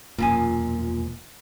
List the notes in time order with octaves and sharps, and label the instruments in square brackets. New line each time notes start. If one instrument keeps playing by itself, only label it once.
[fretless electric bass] E1 A#2 [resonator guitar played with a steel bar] F#2 F3 G#5